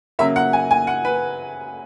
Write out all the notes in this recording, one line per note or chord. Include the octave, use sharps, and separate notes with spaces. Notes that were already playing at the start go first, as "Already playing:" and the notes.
C#3 F#3 A#3 E5
F#5
G#5
G#5
F#5
B4